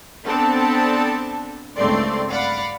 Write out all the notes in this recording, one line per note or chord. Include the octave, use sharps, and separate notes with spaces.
B3 C4 D4 A4 A5
C#2 G2 A3 C4 D5 C6
D5 F5 F#5 B5